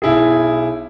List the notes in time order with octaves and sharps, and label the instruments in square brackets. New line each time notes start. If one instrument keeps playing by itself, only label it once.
[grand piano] B1 E4 G#4